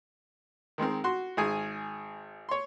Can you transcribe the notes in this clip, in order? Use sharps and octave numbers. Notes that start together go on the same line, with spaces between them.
D#3 G#3 C4 A#4
F#4 C6
G#1 G#4 G#5
C#5 C6